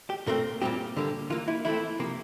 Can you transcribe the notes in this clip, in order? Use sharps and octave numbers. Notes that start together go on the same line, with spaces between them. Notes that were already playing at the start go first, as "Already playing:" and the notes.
G4
A#2 A3 C4 A#4
A#2 G3 C4 G4
D3 G3 A#3
E3 A#3 F4
E4
E3 A3 C4 E4
C3 F3 A#3